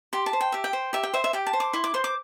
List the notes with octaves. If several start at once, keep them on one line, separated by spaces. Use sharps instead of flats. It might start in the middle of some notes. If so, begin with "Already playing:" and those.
G4 C6
A5
C5
G5
G4 E5
G5
C5
G4 E5
G5
C5 E5
E5
G4 G5
A5
C5
D6
E4 C6
D6
C5 C6
D6